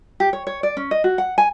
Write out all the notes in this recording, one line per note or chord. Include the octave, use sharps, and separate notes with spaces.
G4
C#5
C#5
D5
C#4
D#5
F#4
F#5
G#5